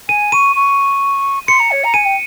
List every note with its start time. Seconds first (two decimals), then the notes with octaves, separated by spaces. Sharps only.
0.09 G#5 D#7
0.32 C#6 D#7
0.56 C#6
1.47 C6 C#7
1.59 A#5
1.71 C#5
1.84 A#5
1.94 G#5 D#7
2.05 G5